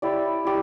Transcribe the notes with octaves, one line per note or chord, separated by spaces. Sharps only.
E4 G4 D5
E4 G4